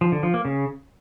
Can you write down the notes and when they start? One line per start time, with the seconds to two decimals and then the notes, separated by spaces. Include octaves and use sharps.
0.01 F3
0.12 D3
0.23 F3
0.34 A#3
0.45 C#3